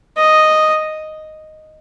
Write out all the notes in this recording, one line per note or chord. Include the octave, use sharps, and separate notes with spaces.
D#5